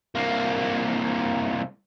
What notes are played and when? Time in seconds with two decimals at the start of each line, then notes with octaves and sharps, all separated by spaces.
0.15 C2 A#3